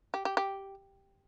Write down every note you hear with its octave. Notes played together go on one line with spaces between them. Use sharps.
G4
G4
G4